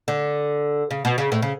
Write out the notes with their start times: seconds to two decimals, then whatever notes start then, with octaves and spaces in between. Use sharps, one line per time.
0.08 D3
0.91 C#3
1.05 B2
1.18 C#3
1.32 A2
1.42 C#3